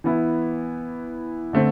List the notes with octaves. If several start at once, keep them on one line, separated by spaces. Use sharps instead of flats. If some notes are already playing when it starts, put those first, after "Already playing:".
E3 B3 E4
D3 A3 C4